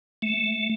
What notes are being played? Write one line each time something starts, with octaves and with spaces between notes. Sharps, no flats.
A3